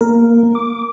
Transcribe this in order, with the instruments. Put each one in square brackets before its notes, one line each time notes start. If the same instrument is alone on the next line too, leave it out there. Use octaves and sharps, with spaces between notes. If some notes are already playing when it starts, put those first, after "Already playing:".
[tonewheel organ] A#3 [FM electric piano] A#4
[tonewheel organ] D6